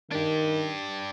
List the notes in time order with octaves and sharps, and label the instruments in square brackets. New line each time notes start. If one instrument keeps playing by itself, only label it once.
[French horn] D#3 [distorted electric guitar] D4 G4